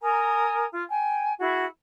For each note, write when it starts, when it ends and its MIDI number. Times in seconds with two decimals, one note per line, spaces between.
0.02 0.64 70
0.02 0.64 80
0.02 0.64 82
0.02 0.64 87
0.70 0.81 65
0.89 1.33 79
0.89 1.33 80
1.38 1.64 64
1.38 1.64 66
1.38 1.64 68